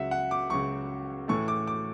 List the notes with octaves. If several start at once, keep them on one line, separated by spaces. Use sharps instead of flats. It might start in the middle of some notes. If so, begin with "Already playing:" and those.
Already playing: C#2 C#3 F#3 E5 F#5
F#5
D6
C#2 C#3 F#3 C#6
A2 E3 A3 C#6
D6
D6